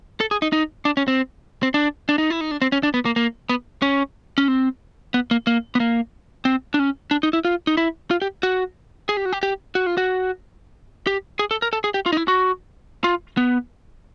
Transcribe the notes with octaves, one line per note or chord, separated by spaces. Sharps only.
A4
G#4
D#4
D#4
D4
C#4
C4
C4
D4
D4
D#4
E4
D#4
D4
C4
C#4
D4
B3
A#3
A#3
B3
C#4
C#4
C4
B3
A#3
A#3
B3
A#3
C4
D4
C#4
D4
D#4
E4
F4
D#4
E4
F4
G4
F#4
G#4
G4
F#4
G4
G4
F#4
F4
F#4
G4
G#4
A4
A#4
A4
G#4
G4
F4
D#4
E4
F#4
F4
B3